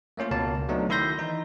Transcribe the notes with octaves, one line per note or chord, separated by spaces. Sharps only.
A3 A#3 C#4 F4
C#2 B2 A#3 F5 A5
F#3 A3 B3 D4 D#4
D#3 E4 E5 C6 G6 A#6
E3 D#4